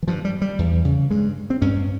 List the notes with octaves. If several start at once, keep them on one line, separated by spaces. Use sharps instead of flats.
E3
G2 F3
G3
G3
E2
C#3
G2 G#3
C4
G2 C#4